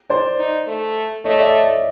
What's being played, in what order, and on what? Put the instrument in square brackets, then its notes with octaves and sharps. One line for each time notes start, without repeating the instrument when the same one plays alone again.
[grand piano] C5 D5
[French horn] D#4
A3
[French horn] A3 [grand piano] C#5 D#5
[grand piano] D5 E5